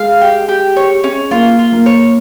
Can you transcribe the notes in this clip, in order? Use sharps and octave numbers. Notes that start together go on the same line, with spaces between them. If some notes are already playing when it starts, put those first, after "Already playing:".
Already playing: G#3 F5
G4
G4
C#5
C#4
A#3 F4
F4
A#3
C#5